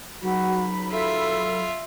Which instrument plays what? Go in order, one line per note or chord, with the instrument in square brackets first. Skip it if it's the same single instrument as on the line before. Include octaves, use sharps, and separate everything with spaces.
[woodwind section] C#2 D#4 B5 [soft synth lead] F#3 [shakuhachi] F#4
[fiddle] F4 E5 [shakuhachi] A4